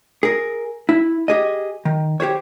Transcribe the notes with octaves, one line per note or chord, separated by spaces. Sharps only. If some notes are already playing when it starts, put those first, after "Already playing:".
G#4 A#4
E4
G4 G#4 D#5
D#3
G4 G#4 C5 C#5